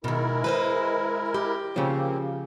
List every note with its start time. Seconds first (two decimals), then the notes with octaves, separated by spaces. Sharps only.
0.04 B2 D#3 G#3 E4 A#4
0.44 B4 C5 D#5
1.34 G4
1.76 C#3 F3 A#3 C4